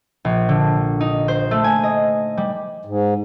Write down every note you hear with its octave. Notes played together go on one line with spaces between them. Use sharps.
A#1
D3
D#4
C5
A3
G#5
D#5
G3
G#2